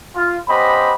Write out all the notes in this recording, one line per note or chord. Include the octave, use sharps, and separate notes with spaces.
F4
B3 C#4 G4 C5 D#5 B5